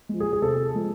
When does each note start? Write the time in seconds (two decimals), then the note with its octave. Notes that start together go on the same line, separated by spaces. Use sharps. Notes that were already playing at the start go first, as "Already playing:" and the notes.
0.09 F3 G#3
0.20 G#4
0.33 G#4
0.42 C3 A4
0.75 F3 G#3